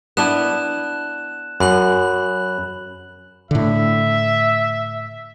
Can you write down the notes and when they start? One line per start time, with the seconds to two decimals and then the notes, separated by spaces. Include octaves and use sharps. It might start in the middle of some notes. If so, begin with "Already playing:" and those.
0.17 B3 D4 E4 F#6 E7
1.60 F#2 B5 F#6 F#7
3.51 A2 D3 E5